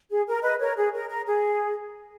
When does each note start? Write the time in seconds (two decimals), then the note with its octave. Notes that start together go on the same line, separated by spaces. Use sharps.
0.10 G#4
0.27 A#4
0.43 B4 D#5
0.60 A#4 C#5
0.77 G#4
0.93 A#4
1.09 A#4
1.26 G#4